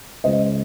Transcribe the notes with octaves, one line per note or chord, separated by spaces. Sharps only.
C#2 C#3 G#3 C5 D#5